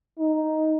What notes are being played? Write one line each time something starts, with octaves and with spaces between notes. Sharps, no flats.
D#4